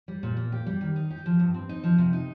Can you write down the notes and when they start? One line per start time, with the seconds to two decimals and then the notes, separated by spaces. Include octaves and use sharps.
0.08 G3
0.23 A#2
0.37 A#3
0.52 G4
0.66 G3
0.81 D#3
0.96 D#4
1.11 G4
1.26 F3
1.40 G2
1.54 C4
1.69 D#4
1.84 F3
1.98 C3
2.13 D#4